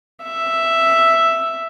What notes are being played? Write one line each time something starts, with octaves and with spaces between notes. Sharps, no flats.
E5